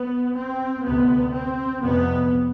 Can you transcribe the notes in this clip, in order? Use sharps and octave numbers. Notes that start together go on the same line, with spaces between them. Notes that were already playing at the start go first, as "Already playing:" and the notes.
Already playing: B3
C4
D2 C3 B3
C4
F1 F2 C3 B3